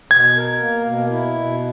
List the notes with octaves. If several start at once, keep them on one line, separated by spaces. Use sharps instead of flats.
B2 G#6
A#4
A#3
B2
E4
B2